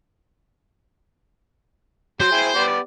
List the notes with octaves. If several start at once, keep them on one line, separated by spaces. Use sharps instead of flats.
F#3 C5
E4 G#4 G5
B3 G4 D5